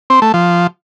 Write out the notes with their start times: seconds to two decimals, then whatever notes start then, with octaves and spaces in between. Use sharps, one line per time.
0.10 C4
0.22 A3
0.34 F3